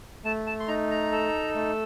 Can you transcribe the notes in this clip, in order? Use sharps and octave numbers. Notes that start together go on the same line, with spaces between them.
A3 A5
A5
C6
D#4 A#5
A#5
A4
A3